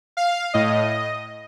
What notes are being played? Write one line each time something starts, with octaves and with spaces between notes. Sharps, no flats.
F5
A2 D#5